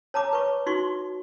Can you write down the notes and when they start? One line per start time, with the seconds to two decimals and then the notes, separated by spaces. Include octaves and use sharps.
0.14 C#5 A5 A#5 D6
0.33 B4 C#6
0.66 D#4 F#4 C6 C#6